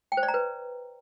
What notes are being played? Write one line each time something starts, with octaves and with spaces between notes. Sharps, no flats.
G5
C5
D5
A#5
B4